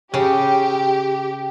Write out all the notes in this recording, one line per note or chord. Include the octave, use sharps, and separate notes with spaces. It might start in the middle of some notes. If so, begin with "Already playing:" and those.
C#3 G4